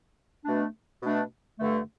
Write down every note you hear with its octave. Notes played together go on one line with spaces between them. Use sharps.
B2 A3 D4
B2 A3 D4
G2 D3 A3